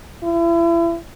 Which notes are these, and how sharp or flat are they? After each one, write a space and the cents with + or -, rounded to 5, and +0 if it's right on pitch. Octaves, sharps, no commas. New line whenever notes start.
E4 +35